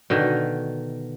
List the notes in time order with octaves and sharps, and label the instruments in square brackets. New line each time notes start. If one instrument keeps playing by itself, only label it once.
[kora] B2 D3 D#3